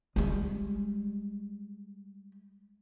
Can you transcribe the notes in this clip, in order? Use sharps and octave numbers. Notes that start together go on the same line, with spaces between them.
G3 G#3